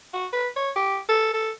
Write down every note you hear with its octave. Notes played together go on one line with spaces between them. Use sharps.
F#4
B4
C#5
G4
A4
A4